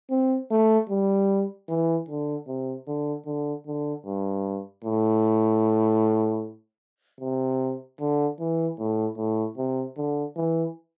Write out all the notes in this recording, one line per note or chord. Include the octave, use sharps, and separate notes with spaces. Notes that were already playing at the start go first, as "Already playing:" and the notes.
C4
A3
G3
E3
D3
C3
D3
D3
D3
G2
A2
C3
D3
E3
A2
A2
C3
D3
E3